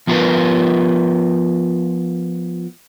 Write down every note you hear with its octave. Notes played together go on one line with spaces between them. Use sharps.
F3 B3 F4 G4 A#4 B4